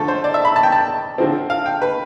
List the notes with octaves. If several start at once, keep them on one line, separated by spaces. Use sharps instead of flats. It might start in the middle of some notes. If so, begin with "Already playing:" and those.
Already playing: D3 F3 A3 A4
C5
D5
E5
B5
A5
G5
A5
D3 F3 C4
F5
G5
B4